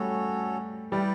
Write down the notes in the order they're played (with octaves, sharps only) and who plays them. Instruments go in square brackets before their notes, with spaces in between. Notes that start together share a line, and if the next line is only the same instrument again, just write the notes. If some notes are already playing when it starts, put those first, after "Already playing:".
Already playing: [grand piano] G3 A3 [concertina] C#4 F#4 A4 C#5
[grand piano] G3 [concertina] E4 B4 D5 G5